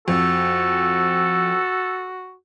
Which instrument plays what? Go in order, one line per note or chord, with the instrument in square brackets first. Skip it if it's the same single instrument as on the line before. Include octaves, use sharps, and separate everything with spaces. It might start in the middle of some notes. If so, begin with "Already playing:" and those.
[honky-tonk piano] F2 [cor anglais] F#4 [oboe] A4